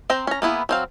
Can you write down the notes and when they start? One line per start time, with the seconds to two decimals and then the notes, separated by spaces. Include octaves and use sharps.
0.10 C4 C5 G5 A#5
0.27 C#4 A#5
0.42 A#3 B3 E4 G#4
0.69 F#3 C4 F5